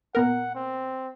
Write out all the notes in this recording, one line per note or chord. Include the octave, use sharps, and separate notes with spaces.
A#2 B3 A#4 F#5
C4